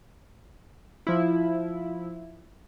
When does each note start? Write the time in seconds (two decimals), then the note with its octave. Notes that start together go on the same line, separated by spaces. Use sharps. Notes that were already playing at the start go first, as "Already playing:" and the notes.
1.07 F3 E4